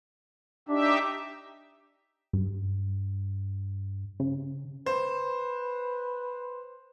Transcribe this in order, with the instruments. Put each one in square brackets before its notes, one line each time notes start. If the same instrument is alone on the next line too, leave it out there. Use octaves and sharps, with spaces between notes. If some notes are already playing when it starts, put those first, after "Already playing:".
[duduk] D4 [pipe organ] D#4 G4 E5
[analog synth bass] G2
C#3
[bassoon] B4 [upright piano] C5